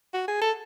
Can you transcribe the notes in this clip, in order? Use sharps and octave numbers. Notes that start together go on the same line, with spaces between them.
F#4
G#4
A4